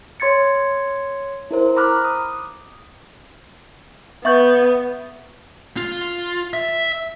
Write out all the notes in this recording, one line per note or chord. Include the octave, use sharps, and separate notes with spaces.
C#5 C6 G#6 A6 C#7
E4 A#4 C5
A#5 B5 D6 F6 F#6
D#6
B3 E5 C#6 G6
F4
E5